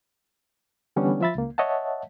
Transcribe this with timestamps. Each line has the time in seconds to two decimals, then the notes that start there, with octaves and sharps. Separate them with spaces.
0.96 D3 E3 G3 B3 C#4 D4
1.21 F3 F4 E5 B5 A6
1.35 C#2 A#3
1.58 C#5 D#5 E5 F#5 A5